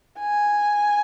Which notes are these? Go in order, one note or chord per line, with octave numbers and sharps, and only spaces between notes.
G#5